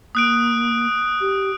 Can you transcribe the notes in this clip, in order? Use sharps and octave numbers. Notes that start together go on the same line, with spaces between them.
A#3 D#6 F#6 D7
G4